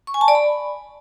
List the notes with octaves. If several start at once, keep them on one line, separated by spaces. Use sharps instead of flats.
C#6
G#5
A5
D5
B5